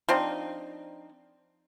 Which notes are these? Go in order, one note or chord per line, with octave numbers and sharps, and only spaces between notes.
F3 C4 D4 D#4